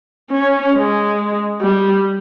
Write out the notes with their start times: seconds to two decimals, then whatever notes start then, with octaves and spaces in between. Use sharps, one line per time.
0.31 C#4
0.74 G#3
1.61 G3